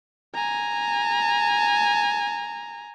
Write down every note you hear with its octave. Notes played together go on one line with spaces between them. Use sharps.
G#5 A#5